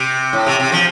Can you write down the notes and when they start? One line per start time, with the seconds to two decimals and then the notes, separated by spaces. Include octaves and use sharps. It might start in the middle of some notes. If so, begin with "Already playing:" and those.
Already playing: C3
0.33 A2
0.47 C3
0.60 C3
0.72 F3